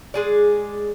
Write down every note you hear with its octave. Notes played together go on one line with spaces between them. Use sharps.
G#3 G#4 D5